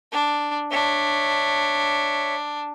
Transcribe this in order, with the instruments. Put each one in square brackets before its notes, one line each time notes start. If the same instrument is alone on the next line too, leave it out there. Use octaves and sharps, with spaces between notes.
[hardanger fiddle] D4
[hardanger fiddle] D4 [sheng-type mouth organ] C#5 E5